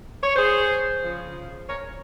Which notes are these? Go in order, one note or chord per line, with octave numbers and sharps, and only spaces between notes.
C#5
G#4 C5
C#3 F3
A#4 C#5